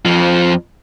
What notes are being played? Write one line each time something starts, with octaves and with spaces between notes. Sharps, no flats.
F2 F3